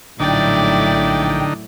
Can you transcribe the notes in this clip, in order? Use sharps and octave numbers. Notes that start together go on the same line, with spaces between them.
A#1 A2 D3 F#3 D#4 E4 D5 G5